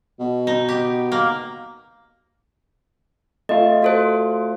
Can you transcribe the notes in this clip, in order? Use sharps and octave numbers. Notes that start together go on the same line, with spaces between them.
B2
D#4
G4
A#3
A3 F4 D#5
F#4 A4 C5